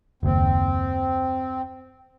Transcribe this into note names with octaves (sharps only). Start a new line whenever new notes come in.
F#1 D#2 C4